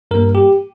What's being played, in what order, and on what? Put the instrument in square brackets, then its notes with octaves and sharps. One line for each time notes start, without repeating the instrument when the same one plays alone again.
[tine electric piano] G2 G3 A#3 A#4
G4